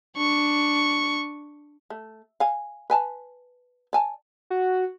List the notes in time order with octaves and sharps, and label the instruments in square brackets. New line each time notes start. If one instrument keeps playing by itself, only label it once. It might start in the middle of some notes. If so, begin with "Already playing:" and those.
[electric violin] D4 C#6
[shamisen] A3
F5 G#5
B4 G#5 A5
D5 G#5 A5
[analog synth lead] F#4